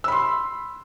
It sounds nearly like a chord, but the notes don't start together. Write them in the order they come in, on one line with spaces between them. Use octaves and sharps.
E6 B5 C6